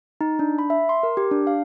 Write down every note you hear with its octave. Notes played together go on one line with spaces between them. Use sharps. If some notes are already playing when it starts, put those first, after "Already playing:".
D#4
D4
B5
E5
C6
A#4
G4
D4
F5